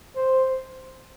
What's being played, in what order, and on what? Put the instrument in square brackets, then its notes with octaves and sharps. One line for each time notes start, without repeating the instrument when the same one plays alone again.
[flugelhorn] C5